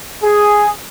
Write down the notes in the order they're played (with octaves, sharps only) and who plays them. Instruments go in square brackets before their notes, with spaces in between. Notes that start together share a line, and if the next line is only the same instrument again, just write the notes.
[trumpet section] G#4